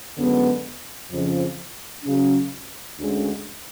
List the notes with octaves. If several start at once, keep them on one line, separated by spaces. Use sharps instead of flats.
F#2 D3 G#3 B3
F2 C#3 F3
C#3 F#3 C#4
D2 D3 G#3 C#4